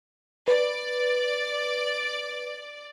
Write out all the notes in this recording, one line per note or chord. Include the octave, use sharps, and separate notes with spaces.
B4 D5